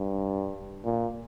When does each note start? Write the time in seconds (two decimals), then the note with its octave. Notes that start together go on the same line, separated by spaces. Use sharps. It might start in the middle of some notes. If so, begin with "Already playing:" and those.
Already playing: G2
0.85 A#2